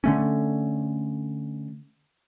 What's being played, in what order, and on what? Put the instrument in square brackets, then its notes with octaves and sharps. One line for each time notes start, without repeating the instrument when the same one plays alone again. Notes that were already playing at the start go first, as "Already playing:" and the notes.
[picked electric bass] D3 A3 C#4